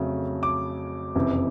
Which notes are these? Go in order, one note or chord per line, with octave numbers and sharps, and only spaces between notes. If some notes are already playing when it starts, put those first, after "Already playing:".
Already playing: F2 C#3 F#3 A3
D6
F#1 F2 C3 E3